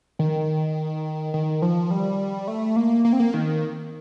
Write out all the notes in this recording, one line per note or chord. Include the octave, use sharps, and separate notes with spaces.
D#3
D#3
F3
G3
A3
A#3
A#3
C4
A#3
D#3